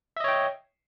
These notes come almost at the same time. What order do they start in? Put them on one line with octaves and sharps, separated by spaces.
E5 D#5 C#5 G5